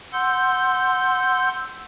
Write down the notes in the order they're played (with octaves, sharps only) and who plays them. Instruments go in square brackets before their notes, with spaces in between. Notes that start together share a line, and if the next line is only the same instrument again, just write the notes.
[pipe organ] F#5 C6 E6 G6